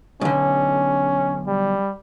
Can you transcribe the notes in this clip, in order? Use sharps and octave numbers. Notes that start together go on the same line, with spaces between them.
B1 D3 C#4
G3